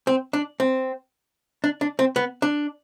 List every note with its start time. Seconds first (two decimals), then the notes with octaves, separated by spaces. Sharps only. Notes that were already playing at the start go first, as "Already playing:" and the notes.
0.07 C4
0.33 D4
0.60 C4
1.64 D4
1.81 D4
1.99 C4
2.16 B3
2.42 D4